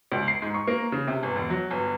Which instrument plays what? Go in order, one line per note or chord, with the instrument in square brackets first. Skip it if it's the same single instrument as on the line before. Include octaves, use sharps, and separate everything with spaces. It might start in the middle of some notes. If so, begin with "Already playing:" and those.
[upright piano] C#2
C7
G#2
C#6
A#3
C#3
C3
G1
E1
F#3
G1